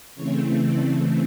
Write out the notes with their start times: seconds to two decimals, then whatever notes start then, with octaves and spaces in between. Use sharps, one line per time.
0.15 C#3 E3 A3 C4 C#5
0.62 D5